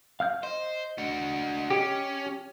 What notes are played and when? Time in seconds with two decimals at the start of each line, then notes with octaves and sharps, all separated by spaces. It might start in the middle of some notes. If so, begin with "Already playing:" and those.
0.20 F5 F6 G6
0.43 C5 D#5
0.98 D4 F#4
1.70 C#4 G4